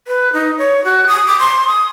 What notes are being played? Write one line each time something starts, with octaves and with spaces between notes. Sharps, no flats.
B4
D#4
C#5
F#4
D#6
D6
C6
D#6